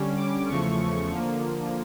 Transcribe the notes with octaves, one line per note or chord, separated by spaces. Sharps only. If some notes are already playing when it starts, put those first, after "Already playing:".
Already playing: D3 G3 C#4
D6
E2 C#3 F3 A3 C#6
D3 F3 A#3